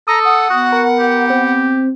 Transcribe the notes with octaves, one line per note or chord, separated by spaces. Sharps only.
A4 A#5 D#6
F#5
B3 F#4
A#4
G4
C4